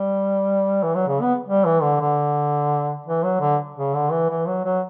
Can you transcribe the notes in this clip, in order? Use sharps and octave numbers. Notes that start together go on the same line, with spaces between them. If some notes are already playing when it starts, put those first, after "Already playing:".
Already playing: G3
E3
F#3
C#3
B3
G3
E3
D3
D3
E3
F#3
D3
C#3
D3
E3
E3
F#3
F#3